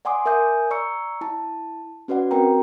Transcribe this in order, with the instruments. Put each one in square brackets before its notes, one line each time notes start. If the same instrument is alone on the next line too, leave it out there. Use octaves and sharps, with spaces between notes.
[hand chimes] D5 F#5 G#5 C6 D6 D#6
A#4 E5 G#5 D#6 G6
D5 A#5 C#6 E6 C#7
E4 A5
C#4 F#4 B4 D5 F#5
C4 F#4 A#4 G5 A#5